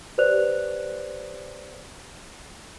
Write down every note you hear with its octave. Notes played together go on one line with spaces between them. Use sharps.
G4 B4 C5 D5 F#6 F7